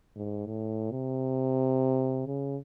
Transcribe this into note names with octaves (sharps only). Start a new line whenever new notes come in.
G#2
A2
C3
C#3